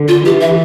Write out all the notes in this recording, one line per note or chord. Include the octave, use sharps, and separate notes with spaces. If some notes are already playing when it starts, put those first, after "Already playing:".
Already playing: D3
F4
E3 G4
E5